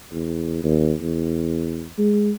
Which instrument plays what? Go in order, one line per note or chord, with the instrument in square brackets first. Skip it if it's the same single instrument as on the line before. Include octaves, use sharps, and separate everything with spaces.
[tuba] E2
D#2
E2
G#3